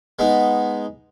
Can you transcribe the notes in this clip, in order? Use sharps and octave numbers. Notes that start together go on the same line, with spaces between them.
G#3 B3 D#4